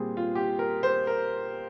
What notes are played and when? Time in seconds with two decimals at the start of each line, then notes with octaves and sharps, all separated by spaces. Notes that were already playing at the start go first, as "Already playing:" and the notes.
Already playing: A#2 G3 C4 G#4
0.17 F4
0.35 G4
0.59 A#4
0.83 C5
1.07 A#4